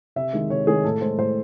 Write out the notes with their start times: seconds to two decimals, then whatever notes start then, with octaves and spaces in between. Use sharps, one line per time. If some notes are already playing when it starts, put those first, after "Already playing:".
0.16 C3 E5
0.33 D#3 G#3
0.50 C3 C#5
0.67 D#3 G#3 G#4
0.84 A2 A4
1.01 G#3 C5
1.18 A2 C5